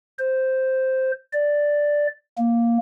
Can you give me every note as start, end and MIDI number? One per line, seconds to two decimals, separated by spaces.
0.19 1.12 72
1.33 2.07 74
2.38 2.78 58